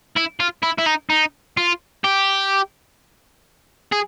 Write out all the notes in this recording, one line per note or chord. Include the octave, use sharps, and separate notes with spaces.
E4
F4
E4
E4
D#4
D#4
F4
G4
G#4